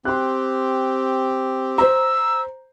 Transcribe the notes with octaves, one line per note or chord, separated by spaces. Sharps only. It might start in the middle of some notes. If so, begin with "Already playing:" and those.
C4 G4 C6 F#6
C5 A#5 E6